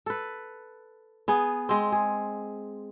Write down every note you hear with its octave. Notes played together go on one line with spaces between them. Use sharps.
A4 B4
B3 G#4
G#3 C4
G#4